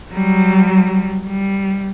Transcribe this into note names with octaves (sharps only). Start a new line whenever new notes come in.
F#3 G3
G3